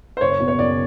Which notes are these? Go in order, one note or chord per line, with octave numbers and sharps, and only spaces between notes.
C5
F#1 C#5
B2
C#5
F#1 D5